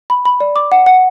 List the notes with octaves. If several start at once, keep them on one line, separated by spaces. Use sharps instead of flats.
B5
B5
D5
D6
F#5
F#5